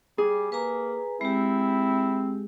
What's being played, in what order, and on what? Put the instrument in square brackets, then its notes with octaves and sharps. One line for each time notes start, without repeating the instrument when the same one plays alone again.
[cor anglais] G3 [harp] G#4
[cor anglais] A#3 [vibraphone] B4 G#5 A#5
[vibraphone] G#3 G4 [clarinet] C4 [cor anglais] E4